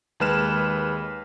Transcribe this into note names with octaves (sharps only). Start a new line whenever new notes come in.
D#2 G#3 B4 F6 E7